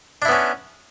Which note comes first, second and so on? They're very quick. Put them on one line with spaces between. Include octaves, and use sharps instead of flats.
D4 E4 B3 C#4